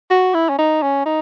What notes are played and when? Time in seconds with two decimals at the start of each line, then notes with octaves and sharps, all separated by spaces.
0.10 F#4
0.34 E4
0.49 C#4
0.58 D#4
0.82 C#4
1.06 D#4